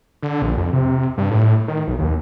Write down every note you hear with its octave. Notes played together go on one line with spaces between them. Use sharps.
D3
A#1
F2
C3
G2
A2
D#3
B1
D#2